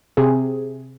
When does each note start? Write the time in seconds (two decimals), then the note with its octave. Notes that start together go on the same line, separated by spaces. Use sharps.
0.17 C3 G#4